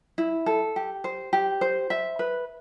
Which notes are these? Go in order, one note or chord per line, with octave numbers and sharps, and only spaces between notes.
E4
A4
G4
C5
G4
C5
E5
B4